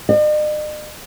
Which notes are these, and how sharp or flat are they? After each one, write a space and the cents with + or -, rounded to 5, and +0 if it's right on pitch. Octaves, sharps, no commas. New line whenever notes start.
D#5 -45